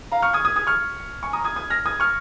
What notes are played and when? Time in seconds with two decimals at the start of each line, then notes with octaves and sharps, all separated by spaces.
0.12 F5 A#5
0.22 C#6 F6
0.33 D#6 G#6
0.45 D#6 G#6
0.56 D#6 G#6
0.67 C#6 F6
1.23 G#5 C#6
1.33 A#5 D#6
1.45 D#6 G#6
1.56 D#6 G#6
1.70 F6 A#6
1.86 D#6 G#6
2.00 C#6 F6